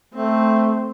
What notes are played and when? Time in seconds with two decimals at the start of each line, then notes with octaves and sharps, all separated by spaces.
0.14 A3 C4